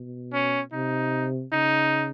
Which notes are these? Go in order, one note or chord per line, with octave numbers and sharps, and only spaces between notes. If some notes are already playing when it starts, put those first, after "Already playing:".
Already playing: B2
C#4
C3 D#4
C#3 D#4